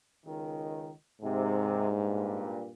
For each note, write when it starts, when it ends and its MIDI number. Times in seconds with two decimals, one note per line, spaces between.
0.24 0.91 37
0.24 0.91 51
1.22 1.88 39
1.22 2.66 44
1.22 1.88 48
1.89 2.73 43
1.89 2.73 46